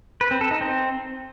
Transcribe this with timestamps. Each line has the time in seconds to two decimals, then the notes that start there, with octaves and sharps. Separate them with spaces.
0.21 B4
0.31 C4
0.41 A4
0.51 D#4
0.61 C4